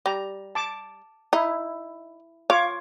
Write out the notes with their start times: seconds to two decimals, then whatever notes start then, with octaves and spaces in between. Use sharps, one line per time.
0.06 G3 A#5
0.55 A5 D6
1.33 D#4 E4
2.50 F4 C#5 F5 D6